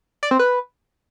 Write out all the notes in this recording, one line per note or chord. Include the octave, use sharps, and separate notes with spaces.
D5
C4
B4